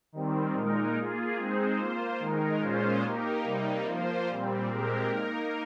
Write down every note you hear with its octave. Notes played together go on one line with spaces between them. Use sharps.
D#3 G3 C4
A#2 G#3 D#4 A#4
A#3 F4 G#4
G#3 C4 D#4 G#4 C5
A#3 F4 C5
D#3 G#3 D#4 A#4
A#2 G#3 C#4 F4 C5
A#3 D#4 G4 A#4
C3 G3 A#3 D#4
F3 A#3 F4 C5
A#2 G3 C4
A#2 G#3 C4 G4 A#4
A#3 D#4 A#4